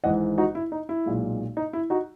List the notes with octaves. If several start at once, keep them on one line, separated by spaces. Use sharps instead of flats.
G#1 G#2 E3 D#5 F#5
D#4 F#4
E4
D#4
E4
B1 A#2 G#3
D#4
E4
D#4 F#4